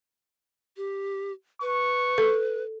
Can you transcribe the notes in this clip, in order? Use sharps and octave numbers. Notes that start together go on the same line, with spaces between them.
G4
B4 C#6
A4